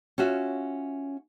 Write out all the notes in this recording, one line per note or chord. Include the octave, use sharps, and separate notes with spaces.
C#4 F4 F#4 E5